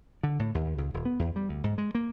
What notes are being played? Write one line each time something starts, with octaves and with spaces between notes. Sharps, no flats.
D3
A2
D#2
C#2
D#1
B3
E2
G3
D2
G#2
G#3
A#3